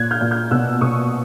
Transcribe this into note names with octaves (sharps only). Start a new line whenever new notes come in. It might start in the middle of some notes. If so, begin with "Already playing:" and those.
Already playing: A#2 F#6 G#6
F6 G6
A#2
F6 G6
B2 E6 F#6
B2 C#6 D#6